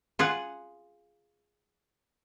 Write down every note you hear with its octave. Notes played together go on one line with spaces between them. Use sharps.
F4 G#4 F5 F#5